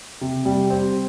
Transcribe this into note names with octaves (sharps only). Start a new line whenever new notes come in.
C3
G3
C4